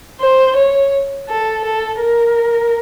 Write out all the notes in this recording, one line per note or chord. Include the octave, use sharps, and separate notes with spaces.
C5
C#5
A4
A4
A#4